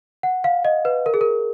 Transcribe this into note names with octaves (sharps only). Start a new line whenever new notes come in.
F#5
F5
D#5
B4
A#4
G#4
A#4